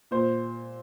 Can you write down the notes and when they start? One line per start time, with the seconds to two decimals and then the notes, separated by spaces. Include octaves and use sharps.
0.11 A#2 C5